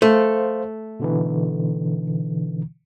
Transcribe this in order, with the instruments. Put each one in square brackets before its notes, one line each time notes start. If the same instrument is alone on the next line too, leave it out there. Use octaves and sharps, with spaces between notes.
[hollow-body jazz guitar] A3 [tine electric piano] C5 F5
[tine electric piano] B2 D3 E3